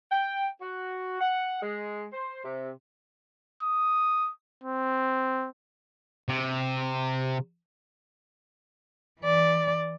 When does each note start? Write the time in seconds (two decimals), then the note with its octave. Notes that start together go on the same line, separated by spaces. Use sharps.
0.12 G5
0.61 F#4
1.21 F#5
1.62 G#3
2.13 C5
2.44 C3
3.63 D#6
4.64 C4
6.29 C3
9.20 E3 D5